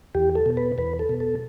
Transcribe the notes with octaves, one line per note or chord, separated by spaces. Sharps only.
E2 G4
A4
B2
B4
E2 B4
A4
B2
A4